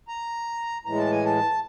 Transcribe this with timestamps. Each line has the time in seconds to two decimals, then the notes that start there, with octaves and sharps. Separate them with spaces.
0.08 A#5
0.85 A2 E3 G#3 A#5
0.98 A5
1.11 G#5
1.25 A5